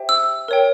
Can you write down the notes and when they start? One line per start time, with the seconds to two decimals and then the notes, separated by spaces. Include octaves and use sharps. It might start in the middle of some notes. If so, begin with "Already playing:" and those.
Already playing: G4 C5 E5 G5
0.09 E6
0.48 A#4 C#5 G5